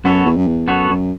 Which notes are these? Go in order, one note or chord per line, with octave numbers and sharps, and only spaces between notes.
F#2 B3 F#4 A4 C#5
E2
F#2
E2
F#2 B3 F#4 A4 C#5
F#2